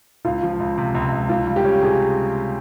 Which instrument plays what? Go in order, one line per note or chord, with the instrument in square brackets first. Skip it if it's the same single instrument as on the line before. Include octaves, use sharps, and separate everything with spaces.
[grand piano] C#2 [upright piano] F4
[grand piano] F3
C#2
C3
C#2
C#2
[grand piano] C#2 [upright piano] F4
[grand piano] G3
[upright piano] G4
[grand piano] C#4
[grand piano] C3 [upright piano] G#4